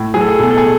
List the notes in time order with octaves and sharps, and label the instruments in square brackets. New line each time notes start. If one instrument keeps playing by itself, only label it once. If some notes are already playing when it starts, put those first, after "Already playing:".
Already playing: [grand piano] A2
F#3 G#4
A4
G#4
A4
B2 G#4
A4
G#4